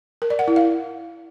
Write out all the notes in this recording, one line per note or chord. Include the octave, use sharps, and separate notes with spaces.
A#4
D5
F#5
E4
F5